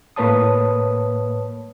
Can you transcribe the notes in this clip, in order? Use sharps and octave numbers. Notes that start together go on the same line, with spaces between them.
A2 A#3 B4 C#5 A5 D#6